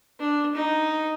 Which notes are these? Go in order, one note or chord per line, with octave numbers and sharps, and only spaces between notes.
D4
D#4